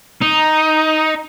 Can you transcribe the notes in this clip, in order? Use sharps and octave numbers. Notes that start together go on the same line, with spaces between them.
D#4